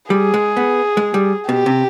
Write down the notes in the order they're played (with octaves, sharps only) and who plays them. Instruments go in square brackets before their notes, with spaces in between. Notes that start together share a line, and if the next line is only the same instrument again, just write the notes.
[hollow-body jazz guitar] G3 [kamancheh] G#4
[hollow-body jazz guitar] G#3
B3
G#3
G3
[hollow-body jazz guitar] B2 [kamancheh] G4
[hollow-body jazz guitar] C3